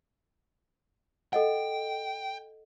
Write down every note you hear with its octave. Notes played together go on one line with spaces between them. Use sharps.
A4 D#5 F#5 G5